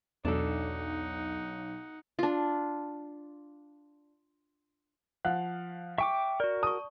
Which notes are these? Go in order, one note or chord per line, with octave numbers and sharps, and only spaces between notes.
B1 E2 D4 D#4 A4 F#5
D4 F4
F3 F5 F#5 F#6
E5 G5 C#6 D6
F#4 A#4 D5
A5 C#6 D#6